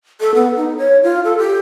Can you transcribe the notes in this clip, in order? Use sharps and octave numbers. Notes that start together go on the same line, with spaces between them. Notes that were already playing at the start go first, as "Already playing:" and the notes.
A4
B3
D#4
C#5
F4
A4
G4